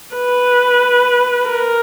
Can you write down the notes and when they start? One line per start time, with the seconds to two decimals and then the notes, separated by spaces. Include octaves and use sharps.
0.15 B4
1.48 A#4